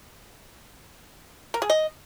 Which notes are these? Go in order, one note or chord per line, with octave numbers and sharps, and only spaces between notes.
A#4
G#4
D#5